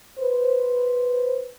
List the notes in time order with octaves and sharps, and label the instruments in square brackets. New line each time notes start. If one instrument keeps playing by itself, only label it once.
[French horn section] B4 C5